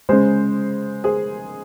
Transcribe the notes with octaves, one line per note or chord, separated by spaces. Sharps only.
C#3 G#3 G#4 C5
G#4 C5